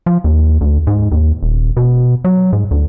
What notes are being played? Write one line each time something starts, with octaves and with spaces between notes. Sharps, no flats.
F3
D#2
D2
G#2
D#2
D#1
B2
F#3
G#2
D2